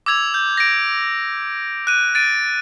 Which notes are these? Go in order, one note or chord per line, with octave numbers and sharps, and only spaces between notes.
D6 E6 G#6 F7
G6
A#6 D7
F#6 D#7
A6 D7 D#7